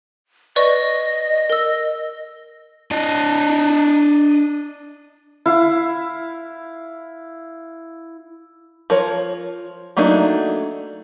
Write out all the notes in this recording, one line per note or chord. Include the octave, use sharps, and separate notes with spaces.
B4 D5 D#5 C#6
A#4 E6
D4 D#5
E4 F5
F3 A#4 C#5
F#3 A3 A#3 D4 D#4